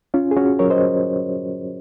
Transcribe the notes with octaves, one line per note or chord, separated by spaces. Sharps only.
C#4 F4
G#4
C#4 F#4
F#3 A#4 C#5
C5 D#5